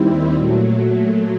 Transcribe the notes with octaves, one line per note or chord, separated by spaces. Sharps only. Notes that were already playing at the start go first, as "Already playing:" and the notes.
Already playing: D#2 D#3 G3 C4 E4
A#2 F#3 A3